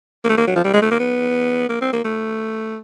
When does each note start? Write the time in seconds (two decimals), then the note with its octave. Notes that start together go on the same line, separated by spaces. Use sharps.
0.25 A#3
0.30 A3
0.38 A#3
0.47 F#3
0.56 F3
0.65 G3
0.74 G#3
0.82 A3
0.91 A#3
1.00 B3
1.69 A#3
1.82 C4
1.93 A#3
2.05 A3